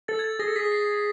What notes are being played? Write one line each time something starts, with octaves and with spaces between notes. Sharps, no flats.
A4 A6
G#6
A6
G#4 A#6
A4
G#4 B6
C7